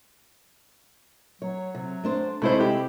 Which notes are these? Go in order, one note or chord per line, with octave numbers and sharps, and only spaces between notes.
F#3 C#5
C3
A3 D4 C5
C3 G#3 A3 E4 C5
E4 G4